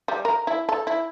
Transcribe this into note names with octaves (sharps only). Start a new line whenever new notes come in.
G3
A#4
E4
A4
E4